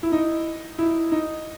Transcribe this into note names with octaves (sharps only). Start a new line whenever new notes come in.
E4
D#4
E4
D#4